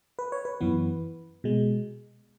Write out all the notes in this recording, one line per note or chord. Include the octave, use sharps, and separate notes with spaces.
B4
C#5
B4
F#2 E3 B3
B2 G#3